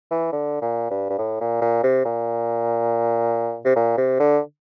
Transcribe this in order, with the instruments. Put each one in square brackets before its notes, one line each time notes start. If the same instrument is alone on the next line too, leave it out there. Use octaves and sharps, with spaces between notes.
[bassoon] E3
D3
A#2
G2
G2
A2
A#2
A#2
C3
A#2
C3
A#2
C3
D3